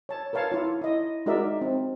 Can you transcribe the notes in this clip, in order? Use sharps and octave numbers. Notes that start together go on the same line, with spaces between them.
C#5 A5
A#4 B4 C#5 F5 A5
E4 F4
E4 D#5
G#3 D#4 F#4 A#4 D5 E5
C4